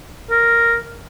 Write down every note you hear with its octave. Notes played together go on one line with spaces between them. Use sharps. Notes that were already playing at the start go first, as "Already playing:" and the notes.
A#4